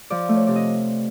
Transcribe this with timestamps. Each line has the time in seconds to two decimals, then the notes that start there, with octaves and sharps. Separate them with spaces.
0.10 F3 D5
0.29 A3
0.35 C#5
0.47 C3 D5
0.56 D#5